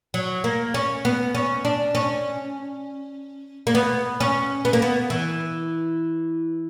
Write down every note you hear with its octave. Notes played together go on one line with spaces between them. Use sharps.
F#3
A#3
C#4
B3
C#4
D4
C#4
A#3
B3
C#4
B3
A#3
B3
E3